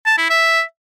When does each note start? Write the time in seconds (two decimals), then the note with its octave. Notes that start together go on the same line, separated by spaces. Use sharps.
0.06 A5
0.18 E4
0.30 E5